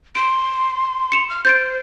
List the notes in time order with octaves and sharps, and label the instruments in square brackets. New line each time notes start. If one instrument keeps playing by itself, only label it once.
[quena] C6 [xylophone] D7
[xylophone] C#7 E7 F7
[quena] F6
[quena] C5 [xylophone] G6 A6 D7